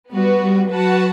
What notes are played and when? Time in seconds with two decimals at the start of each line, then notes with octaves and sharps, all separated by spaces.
0.12 G3 B3 F#4 B4
0.42 G3
0.71 F#3 F#4 B4 F#5 A5